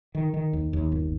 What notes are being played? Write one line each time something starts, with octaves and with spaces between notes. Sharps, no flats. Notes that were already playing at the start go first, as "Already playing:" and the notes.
D#3
D#3
D#2
D#2
G1